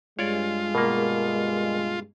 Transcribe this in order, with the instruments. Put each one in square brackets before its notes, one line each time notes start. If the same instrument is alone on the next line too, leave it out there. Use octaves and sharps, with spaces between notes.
[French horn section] G2 G#3 [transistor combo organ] F4 [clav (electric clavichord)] C#5 D5
[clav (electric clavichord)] B2 A#3 [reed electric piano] A#4